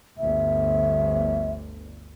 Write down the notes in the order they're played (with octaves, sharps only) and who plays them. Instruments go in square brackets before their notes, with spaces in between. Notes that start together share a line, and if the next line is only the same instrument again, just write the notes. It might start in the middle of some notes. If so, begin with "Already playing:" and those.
[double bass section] G1 D2 [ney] E5